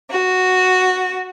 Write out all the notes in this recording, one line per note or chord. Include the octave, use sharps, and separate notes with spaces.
F#4